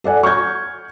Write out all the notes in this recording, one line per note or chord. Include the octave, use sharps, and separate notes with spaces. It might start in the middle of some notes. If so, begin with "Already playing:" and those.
A4 D5 F#5 G#5
C#6 F6 G6 G#6